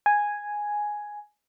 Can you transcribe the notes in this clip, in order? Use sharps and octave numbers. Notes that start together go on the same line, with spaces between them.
G#5